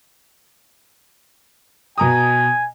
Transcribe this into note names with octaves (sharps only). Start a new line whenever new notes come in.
B2 G#5 A#5 D#6